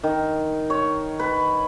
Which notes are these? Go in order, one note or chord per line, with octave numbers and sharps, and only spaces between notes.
D#3
C#5
B4